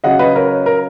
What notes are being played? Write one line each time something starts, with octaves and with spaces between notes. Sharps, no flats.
C#3 F#3 D#5 F#5
B4 D#5
A#4 C#5
A#4